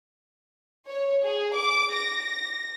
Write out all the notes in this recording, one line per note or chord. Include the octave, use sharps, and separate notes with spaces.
C#5
G#4
D6
A#6